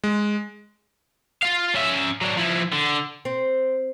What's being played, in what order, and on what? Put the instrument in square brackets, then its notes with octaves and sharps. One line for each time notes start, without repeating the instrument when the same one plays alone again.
[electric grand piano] G#3
[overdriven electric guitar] F4 F5
C#4 E5
F#3 D4
F3 E4
D3
[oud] C4